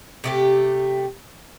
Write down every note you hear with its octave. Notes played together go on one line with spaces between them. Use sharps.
C3 A3 G4